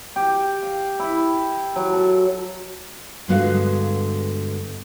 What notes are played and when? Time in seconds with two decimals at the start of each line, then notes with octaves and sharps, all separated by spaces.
0.16 G4
0.63 F5
0.99 E4
1.76 F#3
1.93 A4
3.28 G2 D3 G#3 B3 F#4 F5